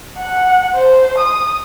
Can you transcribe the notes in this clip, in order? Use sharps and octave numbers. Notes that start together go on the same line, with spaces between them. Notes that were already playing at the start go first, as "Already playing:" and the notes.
F#5
C5
D#6